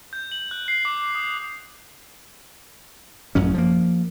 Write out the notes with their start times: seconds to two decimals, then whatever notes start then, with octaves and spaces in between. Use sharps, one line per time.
0.13 G6
0.32 F#7
0.51 F#6
0.68 C7
0.85 D6
1.15 D#6
3.35 A1 F#2 F#3 C#4
3.54 F3 A#3